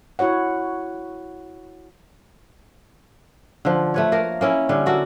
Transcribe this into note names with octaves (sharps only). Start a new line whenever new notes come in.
E4 F#4 C#5 F#5
D3 F3
A3 B4 C#5
A#3 A#4
A#3 C#4 E4
D3 G3 C#4
A#3 F#4 A4